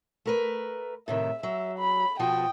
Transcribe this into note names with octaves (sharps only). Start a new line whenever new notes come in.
A3 A#4 B4
A2 C3 D#3 E5
F#3 E5
B5
B2 F3 F#4 G5 D#6